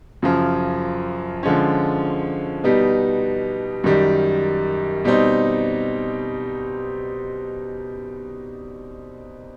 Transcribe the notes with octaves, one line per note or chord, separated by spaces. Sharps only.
F#2 C#3 F3
D3 F3 G#3 C#4
B2 G3 B3 D#4
F#2 D#3 G3
B2 G3 C4 D#4